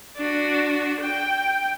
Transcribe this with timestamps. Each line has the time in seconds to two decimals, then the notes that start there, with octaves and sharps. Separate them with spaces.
0.16 D4 F#4
1.00 G5